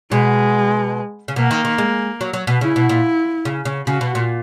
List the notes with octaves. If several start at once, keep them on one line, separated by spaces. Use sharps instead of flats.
B2 G#3
C#3
B2 A#3
D#3
D#3
G#3
F#3
F#3
B2
C#3 E4
B2
A#2
C#3
C#3
C#3 F#4
B2
A#2